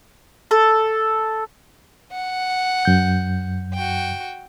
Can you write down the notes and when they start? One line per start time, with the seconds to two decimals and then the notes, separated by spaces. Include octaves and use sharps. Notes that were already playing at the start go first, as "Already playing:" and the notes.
0.51 A4
2.12 F#5
2.85 F#2 G6
3.74 F#4 G5